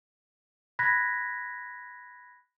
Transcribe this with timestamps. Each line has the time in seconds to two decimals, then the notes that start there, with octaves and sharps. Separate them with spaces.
0.79 B5 F#6 G#6 A#6 B6